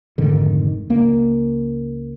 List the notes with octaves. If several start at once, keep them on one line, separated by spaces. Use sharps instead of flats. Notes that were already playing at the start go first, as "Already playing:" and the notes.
F1 G#2 D3 D#3
C#2 A#3